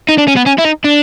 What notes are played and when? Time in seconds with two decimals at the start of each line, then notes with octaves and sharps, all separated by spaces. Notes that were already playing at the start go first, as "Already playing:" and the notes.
0.09 D#4
0.18 D4
0.28 C#4
0.37 B3
0.47 C#4
0.59 E4
0.65 D#4
0.84 D4